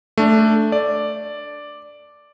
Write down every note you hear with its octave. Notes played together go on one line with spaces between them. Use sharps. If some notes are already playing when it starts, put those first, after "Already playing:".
A3 D4
D5